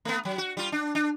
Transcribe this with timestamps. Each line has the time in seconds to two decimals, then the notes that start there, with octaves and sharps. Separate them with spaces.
0.05 A3 B3
0.25 F#3
0.38 F#4
0.57 G3 F4
0.72 D4
0.95 D4